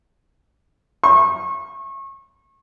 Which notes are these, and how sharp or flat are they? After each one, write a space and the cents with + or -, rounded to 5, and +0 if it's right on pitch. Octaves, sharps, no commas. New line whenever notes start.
C#6 -30